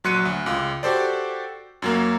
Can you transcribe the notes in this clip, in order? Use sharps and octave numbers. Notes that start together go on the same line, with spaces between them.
A#1 F#3 C6 F#6 C#7 D#7
D2
C#2 F4
F#4 G4 A4 C5 D5
F#2 F#3 A#3